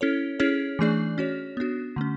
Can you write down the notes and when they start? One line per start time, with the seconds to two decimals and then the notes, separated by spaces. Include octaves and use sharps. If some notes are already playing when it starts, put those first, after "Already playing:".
0.01 C#4 E4 A4 C#5
0.40 C#4 E4 G#4 C#5
0.79 E3 A3 D4 G#4 D5
1.18 C#4 F#4 C#5
1.57 B3 D4 F#4
1.96 D3 A3 C#4